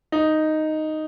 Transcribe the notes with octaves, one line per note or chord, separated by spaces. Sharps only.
D#4